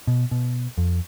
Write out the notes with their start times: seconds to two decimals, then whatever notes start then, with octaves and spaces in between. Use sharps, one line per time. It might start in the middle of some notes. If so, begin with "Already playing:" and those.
0.07 B2
0.31 B2
0.78 F2